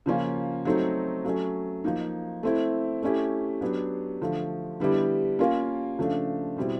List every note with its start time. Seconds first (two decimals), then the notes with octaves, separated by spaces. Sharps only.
0.06 C#3 F3 A#3 C#4 F4
0.65 F#3 A3 C4 D#4 F#4
1.25 F#3 A3 C#4
1.84 F3 A#3 D#4
2.43 A3 C4 E4
3.02 A3 C#4 E4 G4
3.61 F#3 B3 D4 G4
4.21 D3 F3 A3
4.80 D3 G3 B3 E4 G4
5.39 A#3 C#4 F4 A#4
5.99 C#3 F3 A3 D4
6.57 B2 G3 C4 E4